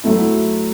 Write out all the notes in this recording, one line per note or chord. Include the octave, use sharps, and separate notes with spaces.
F#3 A3 E4